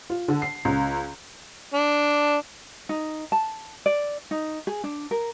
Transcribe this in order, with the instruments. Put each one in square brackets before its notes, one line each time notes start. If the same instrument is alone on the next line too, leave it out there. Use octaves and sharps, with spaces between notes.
[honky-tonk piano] F4
D3
C7
C#2
[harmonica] D4
[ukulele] D#4
A5
D5
D#4
G#4
D4
A#4